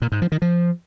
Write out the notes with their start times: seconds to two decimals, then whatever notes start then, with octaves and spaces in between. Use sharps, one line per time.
0.02 A#2
0.12 G#2
0.22 F3
0.32 D#3
0.42 F3